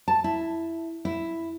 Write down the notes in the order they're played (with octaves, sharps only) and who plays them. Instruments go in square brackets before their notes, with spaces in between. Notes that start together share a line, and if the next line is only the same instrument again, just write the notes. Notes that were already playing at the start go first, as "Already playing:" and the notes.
[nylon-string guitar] A5
E4
E4